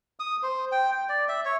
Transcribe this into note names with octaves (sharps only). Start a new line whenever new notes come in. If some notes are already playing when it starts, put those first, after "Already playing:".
D#6
C5
G5
G5
D5
E5
C#5